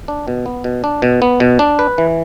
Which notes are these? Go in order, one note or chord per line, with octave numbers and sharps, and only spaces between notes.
D4
B2
B3
B2
D4
B2
B3
B2
D4
B4
E3